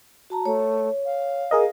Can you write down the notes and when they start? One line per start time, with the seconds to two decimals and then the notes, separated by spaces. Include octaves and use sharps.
0.30 F#4 A5 A#5
0.45 A3 C#5
1.06 F5
1.51 G#4 A#4 D#5